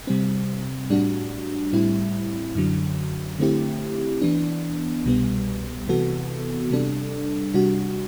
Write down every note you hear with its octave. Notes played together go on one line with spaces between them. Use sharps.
C3 G3 C4
A2 G3 D4 F#4
A2 G3 C4 E4
F#2 D3 F#3
D3 A3 C4 E4 G4
E3 B3 D4
C2 B2 G3 B3
C3 E3 B3 F#4 A4
C3 G3 D4 A4
C3 G3 D4 F#4